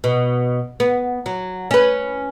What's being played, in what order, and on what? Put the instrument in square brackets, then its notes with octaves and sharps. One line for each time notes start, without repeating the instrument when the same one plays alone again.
[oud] B2
B3
F#3
C#4 B4